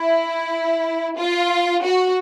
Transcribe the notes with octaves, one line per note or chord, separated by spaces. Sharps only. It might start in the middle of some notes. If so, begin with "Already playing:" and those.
Already playing: E4
F4
F#4